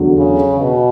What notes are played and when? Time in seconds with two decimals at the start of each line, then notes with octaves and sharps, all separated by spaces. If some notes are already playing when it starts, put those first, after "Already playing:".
Already playing: E2 D3 F#3
0.18 C#3
0.60 B2